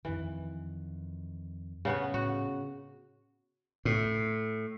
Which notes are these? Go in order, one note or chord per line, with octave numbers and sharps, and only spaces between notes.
F2 D#3 E3
C#3 B3 C#5
A2 F#4
A2